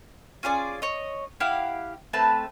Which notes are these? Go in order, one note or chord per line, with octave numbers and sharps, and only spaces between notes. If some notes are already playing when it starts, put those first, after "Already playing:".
C#4 F4 G#4 D5
C#5 D#5
E4 G4 F5 F#5
A3 C4 B4 A5